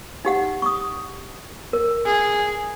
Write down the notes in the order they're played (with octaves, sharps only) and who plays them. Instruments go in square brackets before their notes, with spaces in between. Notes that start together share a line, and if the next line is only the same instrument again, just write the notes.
[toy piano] D#4 G4 F#5
C#6 D#6
A#4
[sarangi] G#4